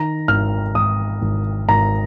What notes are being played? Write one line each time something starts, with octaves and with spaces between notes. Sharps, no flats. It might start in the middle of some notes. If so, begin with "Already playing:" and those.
Already playing: D#3 A#5
G#1 F6
G#1 D#6
G#1
G#1 A#5